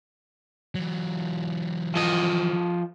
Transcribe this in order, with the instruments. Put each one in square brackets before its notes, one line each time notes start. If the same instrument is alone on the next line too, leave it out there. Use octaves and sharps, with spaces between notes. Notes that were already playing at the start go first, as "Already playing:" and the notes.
[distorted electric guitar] E3 F#3
[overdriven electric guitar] F3 D#5